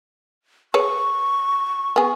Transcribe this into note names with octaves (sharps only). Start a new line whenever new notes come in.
G#4 B4 C#5 C#6
B3 G#4